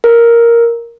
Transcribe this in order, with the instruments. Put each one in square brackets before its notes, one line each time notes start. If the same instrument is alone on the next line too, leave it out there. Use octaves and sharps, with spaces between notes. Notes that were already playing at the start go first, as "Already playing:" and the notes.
[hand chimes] A#4